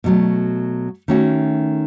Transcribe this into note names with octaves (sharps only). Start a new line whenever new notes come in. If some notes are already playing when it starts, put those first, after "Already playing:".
B2 F#3 A3
D#3 A3 C#4 F#4